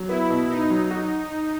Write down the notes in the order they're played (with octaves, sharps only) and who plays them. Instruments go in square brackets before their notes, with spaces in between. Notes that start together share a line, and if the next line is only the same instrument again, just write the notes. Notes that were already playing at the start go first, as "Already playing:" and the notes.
Already playing: [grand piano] F#3
[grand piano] B3 [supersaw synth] E4
[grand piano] B2
[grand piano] B3 [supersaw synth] D#4
[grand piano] F#3
F#4